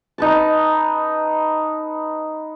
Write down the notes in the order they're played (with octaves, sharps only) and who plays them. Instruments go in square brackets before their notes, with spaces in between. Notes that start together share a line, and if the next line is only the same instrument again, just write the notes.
[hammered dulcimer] D#4 B4 A5